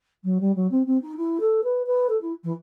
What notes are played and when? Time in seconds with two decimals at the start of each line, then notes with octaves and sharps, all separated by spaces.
0.24 F#3
0.40 G3
0.55 F#3
0.71 C4
0.86 C4
1.01 D#4
1.16 E4
1.40 A4
1.63 B4
1.86 B4
2.09 A4
2.21 E4
2.43 E3